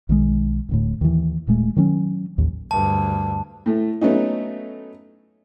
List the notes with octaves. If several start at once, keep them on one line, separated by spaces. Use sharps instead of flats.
B1 D#3 G#3
D1 D2 A2
D#2 E3
D#1 A#2 G#3 A3
D#3 F#3 B3 C#4
A1 D#2
D2 G2 A5
A2 A3
F#3 A3 B3 C#4 D#4